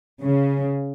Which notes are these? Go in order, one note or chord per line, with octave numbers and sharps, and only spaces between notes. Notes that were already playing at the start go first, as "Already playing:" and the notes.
C#3